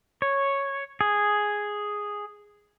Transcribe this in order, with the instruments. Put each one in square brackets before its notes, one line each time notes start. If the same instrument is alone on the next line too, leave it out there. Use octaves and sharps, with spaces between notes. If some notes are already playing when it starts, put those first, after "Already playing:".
[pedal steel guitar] C#5
G#4